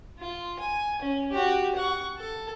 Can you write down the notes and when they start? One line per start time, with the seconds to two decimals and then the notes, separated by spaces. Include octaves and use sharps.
0.19 F4
0.60 G#5
1.02 C#4
1.31 F#4 G4
1.76 F#5 C#6
2.18 A4